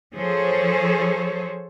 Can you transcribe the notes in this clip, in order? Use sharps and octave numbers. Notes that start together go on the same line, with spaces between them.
F3 G#4 A4 C5 C#5